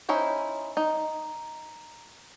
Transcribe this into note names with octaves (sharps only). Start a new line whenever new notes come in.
C#4 D#4 E4 C5
D#4